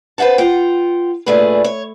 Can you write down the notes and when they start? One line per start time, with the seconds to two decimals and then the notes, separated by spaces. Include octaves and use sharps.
0.18 B4 C5 E5 F#5 A5
0.38 F4 F#5 G5
1.26 A#2 A3 D4 G#4 B4
1.64 C#5